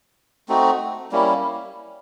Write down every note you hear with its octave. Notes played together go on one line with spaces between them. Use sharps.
A3 C4 D#4 F#4
G3 A#3 C#4 E4